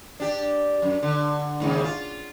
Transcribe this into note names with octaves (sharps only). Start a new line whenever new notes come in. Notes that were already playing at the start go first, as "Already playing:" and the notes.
D4 G4
F#2
D3
D#2 G#2 C#3
F4